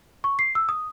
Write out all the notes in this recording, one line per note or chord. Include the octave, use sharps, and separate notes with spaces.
C#6
C7
E6
D#6